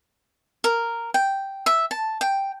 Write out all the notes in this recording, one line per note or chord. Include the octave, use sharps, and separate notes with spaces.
A#4
G5
E5
A5
G5